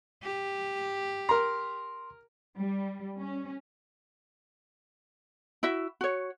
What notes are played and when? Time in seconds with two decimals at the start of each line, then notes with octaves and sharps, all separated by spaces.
0.23 G4
1.29 A#4 A#5 C6
2.58 G3
3.20 C#4
5.63 E4 F#4 E5
6.01 F#4 C#5